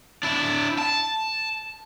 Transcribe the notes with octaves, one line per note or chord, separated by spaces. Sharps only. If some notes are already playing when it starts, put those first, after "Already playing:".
D4 E4
A5